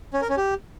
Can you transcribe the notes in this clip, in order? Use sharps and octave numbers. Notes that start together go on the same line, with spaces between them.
C#4
A#4
C#4
G4